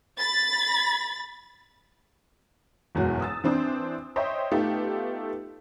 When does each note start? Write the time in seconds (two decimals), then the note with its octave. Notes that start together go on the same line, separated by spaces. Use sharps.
0.19 B5 A6
2.95 F#1 E2 G#2 B2 F#4 C#5
3.21 D#6 E6 A6
3.44 E3 C4 D4 C5
4.16 C5 C#5 D#5 E5 G5
4.52 A3 B3 D#4 F4 G4 A4